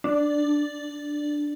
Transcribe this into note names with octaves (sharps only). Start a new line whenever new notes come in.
D4